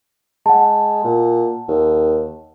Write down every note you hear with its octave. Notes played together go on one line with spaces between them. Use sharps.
G#3 F#5 A5
A#2
D#2